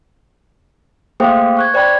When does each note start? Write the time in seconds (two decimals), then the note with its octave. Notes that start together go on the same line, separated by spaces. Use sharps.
1.20 A3 A#3 G#4 C5 F5 G5
1.57 C#6 F#6 G#6
1.74 C5 D5 G5 B5 G#6